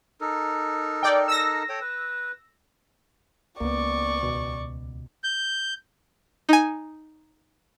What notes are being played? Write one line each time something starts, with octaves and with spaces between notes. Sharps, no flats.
D#4 A4 A#4
D5 G5
E6 A#6
A4 C#5 G5
B4
C#2 A#3 B3 D5 C#6
D#2 B2
G6
D#4 G#5